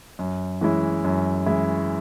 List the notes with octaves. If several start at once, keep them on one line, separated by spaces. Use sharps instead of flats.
F#2
E3 G#3 C#4 E4
F#2
E3 G#3 C#4 E4